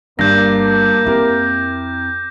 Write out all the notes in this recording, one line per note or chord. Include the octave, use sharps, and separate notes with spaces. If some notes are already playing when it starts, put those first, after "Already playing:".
G1 G2 A#3 D4 D6 G6 A#6
F2 C4 E4 G4 A#4